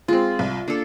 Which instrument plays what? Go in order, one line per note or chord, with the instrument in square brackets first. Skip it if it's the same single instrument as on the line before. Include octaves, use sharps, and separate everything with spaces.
[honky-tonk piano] G#3 C4 [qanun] F4
[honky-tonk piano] C2
[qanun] A#3 A4 [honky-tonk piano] D4